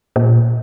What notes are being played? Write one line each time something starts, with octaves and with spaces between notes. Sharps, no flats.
A#2